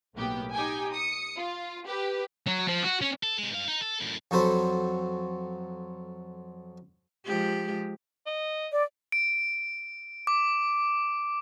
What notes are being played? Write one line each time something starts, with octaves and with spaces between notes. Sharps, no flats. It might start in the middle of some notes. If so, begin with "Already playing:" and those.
B1 A2 A#3 B3 G4
D#4 G4 G5 G#5
D#6 C#7
F4
G4 B4
F#3
F3
F#4
C#4
A4
C3 G#3
G2 F5
D#4
A4
F#2 A2
F2 F#3 F#4 A4 C5 B5
F3 G#3 G4
D#5
D5
D7
D6